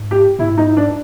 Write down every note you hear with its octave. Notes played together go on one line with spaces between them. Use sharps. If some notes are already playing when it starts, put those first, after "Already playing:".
Already playing: G#2
G4
G#2 E4
D#4
D4